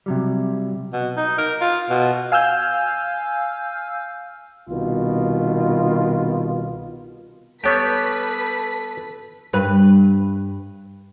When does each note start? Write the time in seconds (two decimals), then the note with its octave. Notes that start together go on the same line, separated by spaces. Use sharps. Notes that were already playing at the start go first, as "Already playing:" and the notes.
0.06 C3 F#3 G3
0.93 B2
1.17 D#4
1.38 A#4
1.61 F4
1.90 B2
2.32 F5 G#5 E6 F6 G6
4.69 C2 B2 D#3 F4
7.64 G3 B3 G4 A4 B4 C#5 G5 B6
9.53 G2 B4